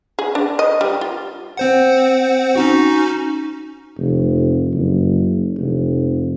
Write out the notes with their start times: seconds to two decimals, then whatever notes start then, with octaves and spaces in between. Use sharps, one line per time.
0.19 G#4
0.35 D4
0.59 D#5
0.81 G3
1.01 F4
1.57 C4 C5 F#5
2.55 C#4 D#4 F#4
3.98 F1
4.73 F#1
5.57 F1